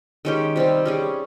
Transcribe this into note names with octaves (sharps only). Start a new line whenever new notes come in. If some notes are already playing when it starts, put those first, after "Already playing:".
D#3 G#3 C#4 G4
C3 G3 C4
G3 C#4 G#4